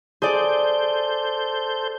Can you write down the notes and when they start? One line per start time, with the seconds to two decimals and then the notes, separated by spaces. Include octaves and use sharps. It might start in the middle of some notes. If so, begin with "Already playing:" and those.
0.22 G#4 A4 C5 D5 G6